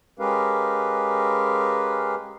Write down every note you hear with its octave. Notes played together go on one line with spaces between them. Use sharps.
G#3 C#4 G4 A#4 B4 F5